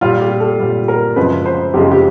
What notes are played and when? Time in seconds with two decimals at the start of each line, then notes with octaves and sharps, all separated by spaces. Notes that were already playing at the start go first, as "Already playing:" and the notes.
0.01 A#2 G3 F4
0.21 G4
0.40 A4
0.60 A#2 G3
0.88 A#4
1.16 F#2 C#3 F3 G#3 B4
1.46 C5
1.74 F#2 C#3 F3 G#3 G4
1.91 G4